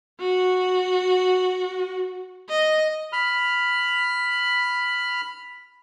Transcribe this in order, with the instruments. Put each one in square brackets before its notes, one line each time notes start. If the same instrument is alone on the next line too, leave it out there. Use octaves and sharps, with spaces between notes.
[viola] F#4
D#5
[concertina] B5 F6